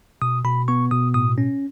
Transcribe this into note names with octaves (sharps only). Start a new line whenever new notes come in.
B2 D#6
B2 B5
B3 C#6
B2 D#6
A2 D#6
C#4